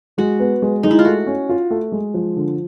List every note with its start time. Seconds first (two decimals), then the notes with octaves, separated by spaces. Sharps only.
0.18 G#3 F#4
0.40 B3
0.62 G#3
0.83 G#3 D#4
0.91 E4
0.99 F4
1.05 A3 F#4
1.26 C#4
1.49 F4
1.71 A3
1.92 G#3
2.14 F3
2.36 D3